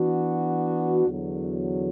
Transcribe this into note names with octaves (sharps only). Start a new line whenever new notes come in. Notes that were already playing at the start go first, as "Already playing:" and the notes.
Already playing: E3 B3 D4 F#4
E2 D3 F#3